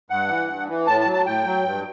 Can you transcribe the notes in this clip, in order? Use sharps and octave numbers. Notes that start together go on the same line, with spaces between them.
G2 F#5
E3
G2
E3
A2 A5
A5
F#3
A5
A2 G5
F#3
G2